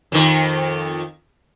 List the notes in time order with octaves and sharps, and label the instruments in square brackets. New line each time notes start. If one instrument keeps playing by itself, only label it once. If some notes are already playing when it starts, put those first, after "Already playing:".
[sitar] F2 D#3